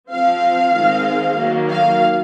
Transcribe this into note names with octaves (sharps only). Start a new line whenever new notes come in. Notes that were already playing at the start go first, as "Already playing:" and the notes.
F3 C4 F5
D#3 G#3 C4
D#3 F#3 A#3
F5